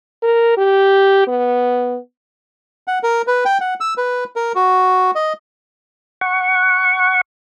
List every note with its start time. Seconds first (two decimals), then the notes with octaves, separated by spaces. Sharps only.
0.22 A#4
0.57 G4
1.27 B3
2.88 F#5
3.03 A#4
3.27 B4
3.45 G5
3.61 F#5
3.80 E6
3.97 B4
4.36 A#4
4.55 F#4
5.15 D#5
6.21 F#5 C#6